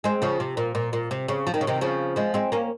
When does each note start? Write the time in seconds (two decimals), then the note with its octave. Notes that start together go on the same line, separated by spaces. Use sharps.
0.04 G#3 C4
0.22 C#3 F3
0.40 C3
0.57 A#2
0.75 A#2
0.93 A#2
1.11 C3
1.28 C#3
1.47 F3
1.54 D#3
1.61 C#3
1.67 C3 D#3
1.81 C#3 F3
2.16 F3 G#3
2.34 G#3 C4
2.52 A#3 C#4